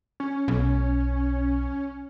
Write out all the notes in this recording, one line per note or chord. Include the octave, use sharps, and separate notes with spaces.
C#4
B1